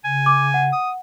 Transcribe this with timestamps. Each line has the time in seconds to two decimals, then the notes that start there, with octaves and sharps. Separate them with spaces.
0.04 C#3 G#5
0.26 D6
0.54 F#5
0.72 D#6